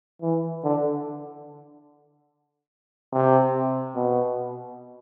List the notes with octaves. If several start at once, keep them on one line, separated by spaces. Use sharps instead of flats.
E3
D3
C3
B2